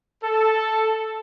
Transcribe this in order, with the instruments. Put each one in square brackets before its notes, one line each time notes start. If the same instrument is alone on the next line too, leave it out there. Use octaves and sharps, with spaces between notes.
[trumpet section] A4